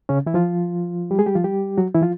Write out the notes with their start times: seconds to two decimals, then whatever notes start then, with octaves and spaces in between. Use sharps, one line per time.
0.09 C#3 C#4
0.26 E3 E4
0.34 F3 F4
1.11 G3 G4
1.19 G#3 G#4
1.26 G3 G4
1.35 F3 F4
1.44 G3 G4
1.78 F#3 F#4
1.94 E3 E4
2.02 F3 F4